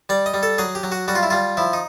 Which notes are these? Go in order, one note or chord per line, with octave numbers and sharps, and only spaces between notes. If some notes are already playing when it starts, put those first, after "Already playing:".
G3 D5
D#5
G3
A4
F#3 G#4
G4
F#3
F#4
G3 F#4
F4
E4
G3 F4
F3 E4
D#4